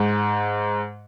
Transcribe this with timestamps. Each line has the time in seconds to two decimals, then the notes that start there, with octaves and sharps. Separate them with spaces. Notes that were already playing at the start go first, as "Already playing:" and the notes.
Already playing: G#2